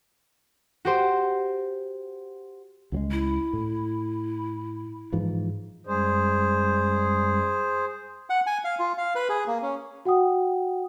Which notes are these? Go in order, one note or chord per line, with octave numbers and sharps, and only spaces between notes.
F#4 G4 C5
C#2 F#3 G#3
E4
A2
G#2 E3 F3
F#2 G3 G#3 G#4 C5
F#5
G#5
F5
F4
F5
B4
G#4
A#3
C#4
F#4 F#5 G5 D#6